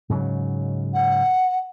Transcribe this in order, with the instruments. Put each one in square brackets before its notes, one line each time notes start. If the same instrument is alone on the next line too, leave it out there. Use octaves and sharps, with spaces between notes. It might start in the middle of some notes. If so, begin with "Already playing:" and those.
[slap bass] G#2 C#3 F#3
[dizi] F#5